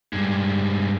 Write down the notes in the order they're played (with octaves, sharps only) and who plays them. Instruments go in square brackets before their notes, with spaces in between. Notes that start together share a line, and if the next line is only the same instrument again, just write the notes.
[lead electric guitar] G2 G#3